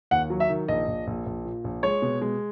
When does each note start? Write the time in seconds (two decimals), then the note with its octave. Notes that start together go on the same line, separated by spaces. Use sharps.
0.11 D#2 F#5
0.30 F#3
0.40 E5
0.49 D#3
0.68 A#1 D#5
0.88 A#1
1.07 A#1
1.26 A#1
1.45 A#2
1.64 A#1
1.83 G#3 C#5
2.02 B2
2.21 G#3